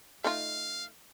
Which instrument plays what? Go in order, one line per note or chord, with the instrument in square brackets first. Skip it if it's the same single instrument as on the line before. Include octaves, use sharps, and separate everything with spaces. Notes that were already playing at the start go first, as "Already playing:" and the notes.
[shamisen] A3 D#4 F4 [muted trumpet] F5